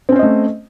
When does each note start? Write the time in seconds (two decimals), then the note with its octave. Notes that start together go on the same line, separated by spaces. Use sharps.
0.09 C4
0.12 C#4
0.16 C5
0.19 D#5
0.23 A3